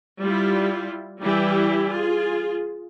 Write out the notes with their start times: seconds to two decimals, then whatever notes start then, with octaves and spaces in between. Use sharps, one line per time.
0.21 G3 E4 F4
1.20 E3 G3 E4 G4
1.90 F4 G#4